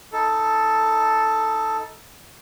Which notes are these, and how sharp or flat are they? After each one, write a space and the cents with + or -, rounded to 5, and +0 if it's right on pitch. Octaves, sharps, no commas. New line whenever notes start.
D#4 +25 A4 +0